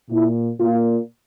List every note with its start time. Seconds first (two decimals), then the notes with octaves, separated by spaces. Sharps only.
0.10 A#2 E4
0.60 A#2 F4